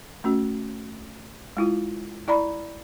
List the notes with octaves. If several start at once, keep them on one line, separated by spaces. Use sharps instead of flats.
A3 C#4 F#4
G#3 E4 F4
E4 D5 A#5 B5